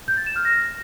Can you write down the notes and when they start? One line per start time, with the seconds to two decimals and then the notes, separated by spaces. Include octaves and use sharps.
0.08 G6
0.17 A6
0.26 E7
0.36 F6
0.45 A#6